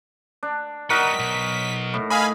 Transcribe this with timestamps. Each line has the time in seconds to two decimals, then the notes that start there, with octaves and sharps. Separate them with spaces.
0.43 D4
0.90 G3 B3 D#4 F#4 A#4 B6
1.19 B1
1.94 A2
2.10 D#5 F5 G#5 B5